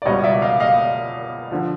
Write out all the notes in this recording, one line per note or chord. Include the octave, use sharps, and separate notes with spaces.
D5
C#2 B2 G3 C#5 D#5
D5 E5
D#5 F5
D#5 F5
D3 F3